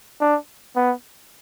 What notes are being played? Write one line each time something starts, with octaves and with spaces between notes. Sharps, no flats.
D4
B3